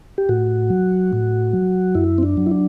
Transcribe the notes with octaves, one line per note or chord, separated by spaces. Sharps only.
G4
A2 F#4
F#3
A2
F#3
F#2 E4
C4
D4
F#3
E4
D4